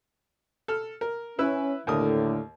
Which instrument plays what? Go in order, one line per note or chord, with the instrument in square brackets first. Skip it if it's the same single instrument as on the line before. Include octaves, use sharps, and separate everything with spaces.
[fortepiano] A4 F6
A#4
[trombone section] C#4 [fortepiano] E4 B4 E6
[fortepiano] D#2 A#4 D#6 [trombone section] A2 D3